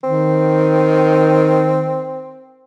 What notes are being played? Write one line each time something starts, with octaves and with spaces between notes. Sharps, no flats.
D#3 C4